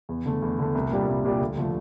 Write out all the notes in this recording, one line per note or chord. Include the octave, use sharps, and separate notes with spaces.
E2
D3 A3
E2
D3 A3
C2
A#2 G3 D4 G4
C2
A#2 G3 D4 G4
D2
D3 F3 A3